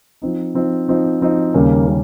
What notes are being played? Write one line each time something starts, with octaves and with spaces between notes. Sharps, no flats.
F3 C4 D#4
F3 C4 D#4
F3 C4 D#4
F3 C4 D#4
D#2 C#3 G3 A#3 C#4
C#3 G3 A#3